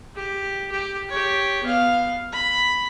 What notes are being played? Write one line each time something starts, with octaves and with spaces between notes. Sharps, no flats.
G4
G4
G4 C#5
B3 F5
B5